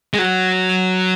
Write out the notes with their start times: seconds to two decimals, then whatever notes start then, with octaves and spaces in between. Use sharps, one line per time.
0.14 G#3
0.19 F#3